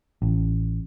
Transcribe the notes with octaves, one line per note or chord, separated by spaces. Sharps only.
A1